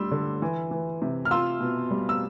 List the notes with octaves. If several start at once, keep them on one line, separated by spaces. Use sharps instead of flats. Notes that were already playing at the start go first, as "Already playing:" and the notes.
Already playing: G3 D4 C6 E6
D3
E3
E3
C3
F6
F4 C6 E6
B2
G3
E6